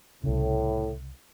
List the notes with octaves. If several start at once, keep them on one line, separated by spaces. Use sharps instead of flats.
C2 A2 C#3